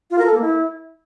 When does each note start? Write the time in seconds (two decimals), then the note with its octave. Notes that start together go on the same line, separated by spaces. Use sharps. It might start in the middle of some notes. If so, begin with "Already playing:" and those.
0.11 F4
0.18 A#4
0.26 A4
0.34 A#3
0.42 E4